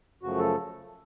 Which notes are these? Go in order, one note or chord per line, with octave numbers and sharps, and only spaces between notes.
F#2 C#3 F3 A3 F#4
A4